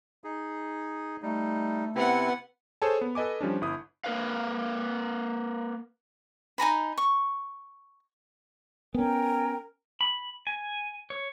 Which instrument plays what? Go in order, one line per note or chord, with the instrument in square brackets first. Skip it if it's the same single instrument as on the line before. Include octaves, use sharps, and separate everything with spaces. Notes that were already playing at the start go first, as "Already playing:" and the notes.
[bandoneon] D#4 G#4
[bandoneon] G3 D#4 [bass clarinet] A3
[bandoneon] C3 C4 E4 [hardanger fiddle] B3 F#5
[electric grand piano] G#4 A4 C5 C#5 G#5 A5
B3
A4 B4 D#5 G#5 D6
F3 G3 C#4 D4
G1 E4 D#6
[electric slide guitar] A#3 A#4 B4 F5
[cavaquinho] D#4 G#5 A#5 B5
C#6
[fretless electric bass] B3 C#4 [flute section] A#4 G5 G#5
[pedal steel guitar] B5
G#5
C#5